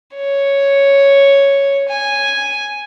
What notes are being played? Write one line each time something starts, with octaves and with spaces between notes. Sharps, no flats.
C#5
G#5